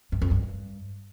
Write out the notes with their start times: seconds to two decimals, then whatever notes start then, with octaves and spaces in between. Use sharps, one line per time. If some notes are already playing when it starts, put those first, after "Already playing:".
0.12 G2
0.22 F2
0.31 G2